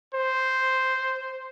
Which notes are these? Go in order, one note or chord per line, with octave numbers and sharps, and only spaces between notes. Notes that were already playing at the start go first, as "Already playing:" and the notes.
C5